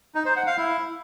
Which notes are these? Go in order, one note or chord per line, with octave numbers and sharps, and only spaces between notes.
D#4
C5
F#5
F5
E4